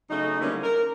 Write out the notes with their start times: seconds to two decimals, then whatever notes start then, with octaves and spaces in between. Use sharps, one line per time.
0.10 C#3 F#3 A3 D#4
0.41 D3 E3 G3 A3 A#3 C#4
0.63 A#4